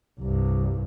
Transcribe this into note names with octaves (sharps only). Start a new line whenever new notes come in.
C2 G2